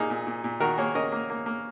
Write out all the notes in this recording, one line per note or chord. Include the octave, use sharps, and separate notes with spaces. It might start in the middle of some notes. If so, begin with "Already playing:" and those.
Already playing: A#2 A#3 D#4 G#4
A#2
A#2
A#2
D#3 F#4 A#4
A#3 G#4 C#5
C#4 A#4 D#5
A#3
A#3
A#3